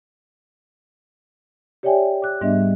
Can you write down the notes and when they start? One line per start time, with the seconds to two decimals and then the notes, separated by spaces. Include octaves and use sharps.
1.83 G4 C#5 D5 E5 G5 G#5
2.22 D6 F#6
2.41 G#2 G3 B3 D4 D#5 E5